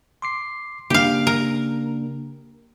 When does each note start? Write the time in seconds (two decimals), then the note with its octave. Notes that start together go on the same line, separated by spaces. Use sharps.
0.22 C6 D6 C7
0.90 C#3 A#3 D4 G4 F5
1.27 A#4